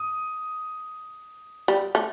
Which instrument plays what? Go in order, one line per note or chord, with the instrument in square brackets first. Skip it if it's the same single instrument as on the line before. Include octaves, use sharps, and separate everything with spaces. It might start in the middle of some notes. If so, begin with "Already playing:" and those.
Already playing: [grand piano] D#6
[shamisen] G3
A3